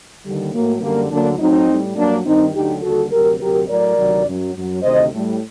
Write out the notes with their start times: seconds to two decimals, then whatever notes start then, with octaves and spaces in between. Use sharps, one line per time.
0.24 D#2 D3 G3
0.52 A2 F#3 A#3
0.81 F#2 D3 G3 A#3
1.10 D2 D3 F#3 A#3 D4
1.39 A2 F#3 C4 D#4
1.67 A2 G3
1.96 G2 F#3 A#3 D4
2.25 G2 D#3 G3 C4 D#4
2.53 D2 D3 F#3 D#4 G4
2.82 D#2 D3 G3 F#4 A4
3.11 D2 C3 F#3 G4 A#4
3.39 D2 C3 F#3 G4 A#4
3.68 A2 F#3 A#4 D5
3.97 D2 C3 D#3 F#3
4.26 F#2 F#3
4.55 F#2 F#3
4.83 D2 C3 D#3 C5 D#5
5.12 A2 G3